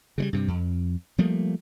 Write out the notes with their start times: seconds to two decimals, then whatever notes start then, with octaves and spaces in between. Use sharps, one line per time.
0.18 C#3 F#3 G3
0.33 G2 C3
0.48 F2
1.18 F3 G3 A3 A#3